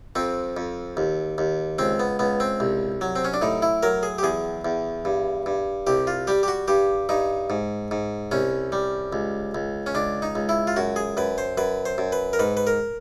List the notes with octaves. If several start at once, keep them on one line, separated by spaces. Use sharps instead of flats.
F2 C4
F2
D#2
D#2
C#2 C4
B3
C#2 B3
C4
C2
F#3
C4
C#4
D4
A2 D#4
E4
F#3 A#4
G#4
G4
E2 G#4
E2
G2
G2
C2 G4
F4
G3 G4
G4
F#4
G2 G4
G2 D#4
G#2
G#2
C2 C#4
G3
C#2
C#2
C#4
C#2 D4
D#4
C#2
E4
F4
F#2 F#4
G#4
F#2 B4
C5
F#2 B4
C5
F#2
B4
A#4
G#2 B4
B4
A#4